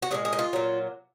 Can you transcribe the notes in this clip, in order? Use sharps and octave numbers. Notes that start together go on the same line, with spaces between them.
F#4
A#2 F3 G#3 G#4
G#4
D#4
F4
A#2 F#3